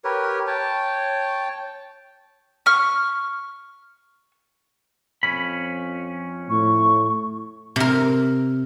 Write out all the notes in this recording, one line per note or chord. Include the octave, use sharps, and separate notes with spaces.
G4 A#4 B4 C#5
C#5 G5 A5
C#6 F6
F2 C#4 B5
A2 C#6
C3 A#4